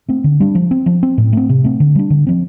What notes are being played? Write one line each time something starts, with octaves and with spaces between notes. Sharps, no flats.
A3 C4
D3
G3 D4
F3
C4
F3
C4
A2
A3 C4
C3
A3 C4
D3
G3 D4
D3
F3 C4